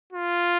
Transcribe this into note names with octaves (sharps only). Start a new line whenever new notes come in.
F4